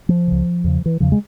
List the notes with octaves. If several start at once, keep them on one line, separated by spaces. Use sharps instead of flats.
F3
C#2 C#3
E2 C#3
E3
E2 C#3 F3
G#3